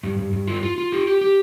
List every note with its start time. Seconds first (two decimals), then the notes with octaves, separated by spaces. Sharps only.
0.03 G2
0.19 G2
0.33 G2
0.47 F4
0.63 F4
0.78 F4
0.92 G4
1.07 G4
1.21 G4